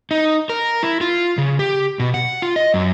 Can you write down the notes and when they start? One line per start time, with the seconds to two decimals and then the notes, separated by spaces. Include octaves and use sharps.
0.11 D#4
0.49 A#4
0.83 E4
1.01 F4
1.38 C#3
1.59 G4
1.99 B2
2.14 F#5
2.42 F4
2.56 D#5
2.74 F#2